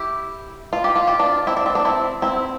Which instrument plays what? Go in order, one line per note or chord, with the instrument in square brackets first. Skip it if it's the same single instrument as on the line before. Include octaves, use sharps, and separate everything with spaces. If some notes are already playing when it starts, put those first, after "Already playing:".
Already playing: [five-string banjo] E4 G4
F4
G4
F4
G4
D4 F4
C4 E4
D4
C4
D4
C4 E4
C4 E4